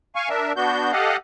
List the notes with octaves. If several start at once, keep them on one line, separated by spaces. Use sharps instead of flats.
F5 G#5 C#6
D4 A#4 E5
B3 D4 F#4 G6
G4 A4 D#5 F5 F#5